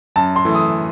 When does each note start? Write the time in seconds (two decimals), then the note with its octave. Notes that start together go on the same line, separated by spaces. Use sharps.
0.16 F#2 A5
0.36 C6
0.45 E3 A3
0.55 D#6